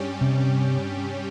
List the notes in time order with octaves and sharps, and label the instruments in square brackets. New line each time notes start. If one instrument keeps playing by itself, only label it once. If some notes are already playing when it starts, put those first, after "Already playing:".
Already playing: [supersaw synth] G2 G3 C#4 G4
[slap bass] C3